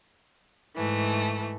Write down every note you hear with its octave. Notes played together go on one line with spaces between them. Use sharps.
G#2 E3 A3